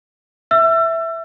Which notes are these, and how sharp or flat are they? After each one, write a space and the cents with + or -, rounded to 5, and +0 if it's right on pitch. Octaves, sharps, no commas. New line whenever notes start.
E5 +0 E6 +35